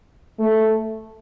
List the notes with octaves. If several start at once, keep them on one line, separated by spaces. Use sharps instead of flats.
A3